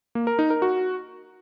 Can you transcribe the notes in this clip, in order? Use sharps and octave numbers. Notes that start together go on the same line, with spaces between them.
A#3
A#4
D#4
A#4
F#4